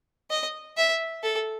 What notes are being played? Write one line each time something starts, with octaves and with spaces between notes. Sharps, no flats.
D#5
E5
A4